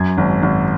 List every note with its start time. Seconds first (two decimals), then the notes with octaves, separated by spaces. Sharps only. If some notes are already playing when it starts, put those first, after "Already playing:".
Already playing: F#2 G#6
0.18 G#1
0.43 G#1